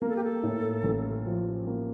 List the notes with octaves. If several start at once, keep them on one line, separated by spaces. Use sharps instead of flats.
A#3 A#4
A4
G4
A4
A2
A1
F3
A#3